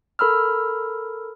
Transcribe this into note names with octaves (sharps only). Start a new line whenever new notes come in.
A4 A#4 B5 E6 F6